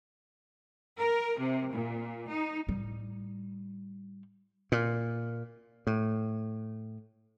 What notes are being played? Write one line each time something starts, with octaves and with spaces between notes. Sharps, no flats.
A#4
C3
A#2
D#4
A2 G3
A#2
A2